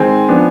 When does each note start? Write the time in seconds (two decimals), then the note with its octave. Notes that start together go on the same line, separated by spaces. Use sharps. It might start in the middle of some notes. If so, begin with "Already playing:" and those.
Already playing: D#3 G#3 C4 G#5
0.28 F3 B3 D4